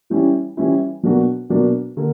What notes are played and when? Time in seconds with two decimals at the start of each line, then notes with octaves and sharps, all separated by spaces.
0.10 E3 G3 C#4 E4
0.57 E3 G3 C#4 E4
1.03 B2 F#3 A#3 D4 F#4
1.50 B2 F#3 A#3 D4 F#4
1.97 D3 A#3